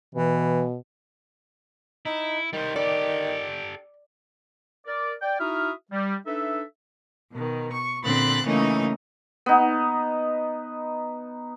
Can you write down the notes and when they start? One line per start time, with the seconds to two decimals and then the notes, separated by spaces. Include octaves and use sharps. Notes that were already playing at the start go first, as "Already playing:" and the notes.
0.15 B2 E3
2.06 D#4 E4
2.53 D#3 G3 C5
2.76 G4 A4 D5
4.86 A#4 D5
5.21 D5 G5
5.39 D#4 E4 F#4 E5 D#6 F6
5.91 G3
6.26 D4 D#4 A4 B4 E5
7.33 B2 D#3
7.72 C#6
8.04 A#2 D3 C4 B5 F#6 A6
8.45 C#3 E3 A3 A#3 C#4 D#4
9.46 B3 D#4